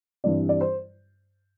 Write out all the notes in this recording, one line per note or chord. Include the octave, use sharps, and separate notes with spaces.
G2 E3 G3 C4 D5
D5
C5